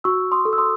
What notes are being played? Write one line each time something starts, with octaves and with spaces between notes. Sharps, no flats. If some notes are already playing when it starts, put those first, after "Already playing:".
F#4 C#6 E6
C6 D#6
A4
E6
C6 D#6